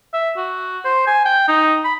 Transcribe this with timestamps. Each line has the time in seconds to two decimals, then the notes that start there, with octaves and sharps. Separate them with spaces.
0.13 E5
0.37 F#4
0.85 C5
1.07 G#5
1.25 G5
1.48 D#4
1.84 B5